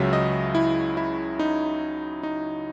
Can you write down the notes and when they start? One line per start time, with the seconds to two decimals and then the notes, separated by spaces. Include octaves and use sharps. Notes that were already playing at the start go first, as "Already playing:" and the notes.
Already playing: C#2 C#3 F#3 E5
0.13 D#5
0.55 E4
0.97 E4
1.39 D#4
2.23 D#4